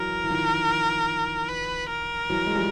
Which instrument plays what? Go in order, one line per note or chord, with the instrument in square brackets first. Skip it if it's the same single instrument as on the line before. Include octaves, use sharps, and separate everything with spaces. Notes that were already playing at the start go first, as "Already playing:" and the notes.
Already playing: [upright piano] E3 F#3 [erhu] A#4
[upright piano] E3
D#3 F3
[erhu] B4
A#4
[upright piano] E3 F#3
G#3
F3 G3